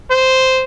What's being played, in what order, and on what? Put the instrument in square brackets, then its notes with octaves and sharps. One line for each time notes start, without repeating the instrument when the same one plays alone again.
[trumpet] C5